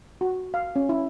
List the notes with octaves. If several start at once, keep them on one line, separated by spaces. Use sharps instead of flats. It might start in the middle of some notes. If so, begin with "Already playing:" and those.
F#4
F5
C#4
E4